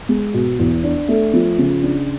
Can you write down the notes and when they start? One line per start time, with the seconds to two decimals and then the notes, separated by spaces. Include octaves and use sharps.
0.09 G#3
0.34 B2
0.59 E2
0.84 D4
1.08 A3
1.33 F3
1.58 C#3
1.83 D4